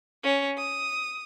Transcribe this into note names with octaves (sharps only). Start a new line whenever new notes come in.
C#4
D#6